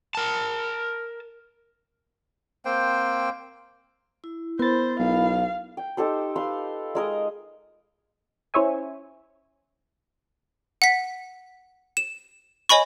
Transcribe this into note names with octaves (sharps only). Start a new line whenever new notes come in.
A#4 A5
A#3 C4 C5 G5
E4
B3 E4 A#4 C5 B5 A6
B1 F5
G5
D#4 G4 A4 C5
B4 F5 C6
G#3 A#4 D#5
C#4 E4 C5 C#5 E5 G#5
F#5 B6
E7
C#5 D#5 G#5 B5 C#6